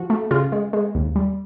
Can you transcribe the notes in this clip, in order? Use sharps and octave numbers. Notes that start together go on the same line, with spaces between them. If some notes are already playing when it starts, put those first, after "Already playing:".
Already playing: F3 F#4
A3
C#3 F4
G#3
G#3
D#2
G3